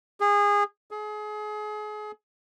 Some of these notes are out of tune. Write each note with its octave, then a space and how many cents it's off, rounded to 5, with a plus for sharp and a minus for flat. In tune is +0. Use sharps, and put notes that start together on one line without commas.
G#4 -25
G#4 +30